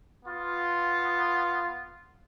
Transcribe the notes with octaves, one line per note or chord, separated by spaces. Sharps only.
B3 F4